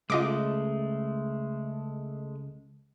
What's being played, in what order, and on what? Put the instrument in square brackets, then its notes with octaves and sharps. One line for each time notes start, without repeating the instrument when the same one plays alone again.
[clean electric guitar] C#2 [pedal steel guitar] G#3 A3 [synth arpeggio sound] F4 D#5 D6